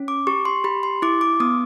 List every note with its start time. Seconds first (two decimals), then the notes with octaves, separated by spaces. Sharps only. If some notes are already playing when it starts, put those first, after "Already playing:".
Already playing: C#4
0.08 D6
0.27 G4 C#6
0.45 C6
0.64 G4 B5
0.83 C6
1.02 E4 D6
1.21 D6
1.40 B3 D#6